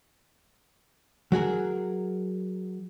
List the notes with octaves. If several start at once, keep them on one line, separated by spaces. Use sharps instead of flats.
F#3 F#4 G#4 A#4